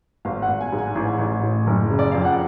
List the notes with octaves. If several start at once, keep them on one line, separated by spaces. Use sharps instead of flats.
G#1 F5
F#5
G#1
G#5
G#2
G#5
A1
A1
A2
F#1
C#3
D5
F2 F5
F#5